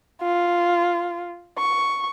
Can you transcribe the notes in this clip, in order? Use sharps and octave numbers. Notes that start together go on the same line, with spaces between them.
F4
C#6